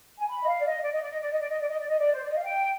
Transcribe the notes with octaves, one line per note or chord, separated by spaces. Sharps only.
G#5
B5
D#5
F5
D5
D#5
D5
D#5
D5
D#5
D5
D#5
D5
D#5
D5
D#5
D5
D#5
D5
C5
D5
D#5
F5
G5